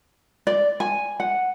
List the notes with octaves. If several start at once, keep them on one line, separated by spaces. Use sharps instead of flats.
D5
G#5
F#5